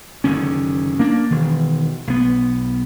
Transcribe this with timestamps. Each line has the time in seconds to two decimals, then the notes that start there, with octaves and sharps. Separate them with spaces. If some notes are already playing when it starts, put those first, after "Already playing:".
0.24 F#1 D3 D#3 C#4
1.00 A#3 D4
1.30 E1 D#3
2.07 B1 B3